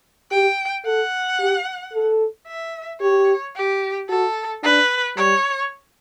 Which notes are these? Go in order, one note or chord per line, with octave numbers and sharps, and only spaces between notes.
G4 G5
A4 F#5
G4
A4
E5
G4 C#5
G4
F#4 A4
D4 B4
G3 C#5